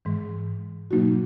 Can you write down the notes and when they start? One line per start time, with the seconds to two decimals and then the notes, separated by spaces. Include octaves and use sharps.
0.05 G#2 E3 G#3
0.91 B2 F#3 A#3 D#4 F#4